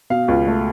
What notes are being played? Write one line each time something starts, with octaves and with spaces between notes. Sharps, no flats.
B2 F5
C#2
A3